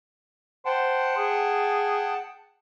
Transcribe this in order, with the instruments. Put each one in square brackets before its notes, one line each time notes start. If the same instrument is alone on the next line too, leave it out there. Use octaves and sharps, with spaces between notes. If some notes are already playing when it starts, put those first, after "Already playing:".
[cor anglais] C5 [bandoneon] F#5 G5 A5
[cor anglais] G#4